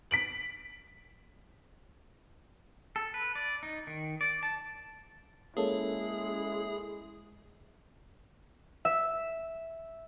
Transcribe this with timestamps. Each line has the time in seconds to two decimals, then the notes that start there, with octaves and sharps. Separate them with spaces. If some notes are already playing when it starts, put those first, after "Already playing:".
0.11 B6 D7 F#7
2.96 A4
3.14 B4
3.35 D5
3.63 D#4
3.87 D#3
4.21 D5
4.43 A5
5.57 G#3 A#3 C#4 E4 G#4 A4
8.85 E5